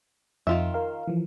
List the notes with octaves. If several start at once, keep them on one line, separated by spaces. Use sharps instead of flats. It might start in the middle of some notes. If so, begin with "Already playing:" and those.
F2 D#3 F4 E5
A#4 F5
E3 F3